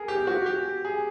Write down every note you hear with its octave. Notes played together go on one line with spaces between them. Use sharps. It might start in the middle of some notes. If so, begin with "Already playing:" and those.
Already playing: G#4 A#4
G4
F#4
G4
G#4